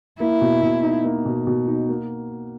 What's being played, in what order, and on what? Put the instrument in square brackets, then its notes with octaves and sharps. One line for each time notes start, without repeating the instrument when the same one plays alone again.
[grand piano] A#3 [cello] E4
[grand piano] B2
B2
D#4
A#3
B2
B2
D#4
A#3